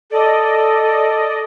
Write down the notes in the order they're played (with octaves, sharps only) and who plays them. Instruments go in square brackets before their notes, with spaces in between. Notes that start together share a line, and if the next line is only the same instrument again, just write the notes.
[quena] A4 [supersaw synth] D5 D#5